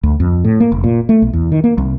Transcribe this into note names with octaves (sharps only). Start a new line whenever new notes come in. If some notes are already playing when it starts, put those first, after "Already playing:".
D2
F2
A2
A#3
F1
A#2
A3
B1
E2
D#3
A#3
C2